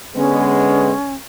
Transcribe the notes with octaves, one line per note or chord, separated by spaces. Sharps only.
D3 G#3 B3 C#4